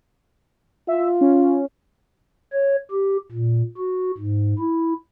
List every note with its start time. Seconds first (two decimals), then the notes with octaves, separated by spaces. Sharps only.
0.88 F4 E5
1.21 C#4
2.53 C#5
2.91 G4
3.32 A#2
3.78 F#4
4.18 G#2
4.59 E4